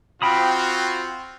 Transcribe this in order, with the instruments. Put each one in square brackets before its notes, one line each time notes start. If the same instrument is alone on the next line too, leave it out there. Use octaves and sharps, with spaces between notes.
[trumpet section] C4 F4 F#4 [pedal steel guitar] G5 B5 D#6